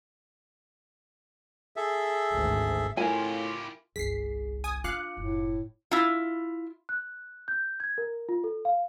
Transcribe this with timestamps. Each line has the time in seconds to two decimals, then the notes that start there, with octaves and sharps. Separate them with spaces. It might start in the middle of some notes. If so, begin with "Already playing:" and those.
1.76 G#4 A4 E5
2.33 G#1 D2
2.97 A2 E4 F4 G4 A#4 G#5
3.96 G1 C2 G#4 B6 C7
4.64 G#5 D#6
4.84 D4 F4 F5 D6 F#6 C#7
5.17 F#1 A2
5.91 E4 F4
6.89 F#6
7.48 G6
7.80 G#6
7.98 A#4
8.29 F4
8.44 A4
8.65 F5